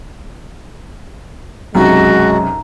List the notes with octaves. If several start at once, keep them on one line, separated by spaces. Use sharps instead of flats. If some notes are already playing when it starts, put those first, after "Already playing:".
B1 F#2 C3 G#3 F#4 A#5